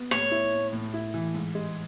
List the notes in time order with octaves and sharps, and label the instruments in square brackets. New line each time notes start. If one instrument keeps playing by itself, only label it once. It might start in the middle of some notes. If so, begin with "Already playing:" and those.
Already playing: [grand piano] B3
[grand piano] A2 [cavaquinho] C#5
[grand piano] E4
A2
A2
E4
E3
G#2
G#3